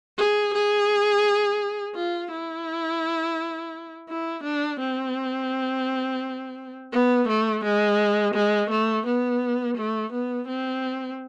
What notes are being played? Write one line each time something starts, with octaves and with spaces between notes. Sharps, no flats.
G#4
G#4
F4
E4
E4
D4
C4
B3
A3
G#3
G#3
A3
B3
A3
B3
C4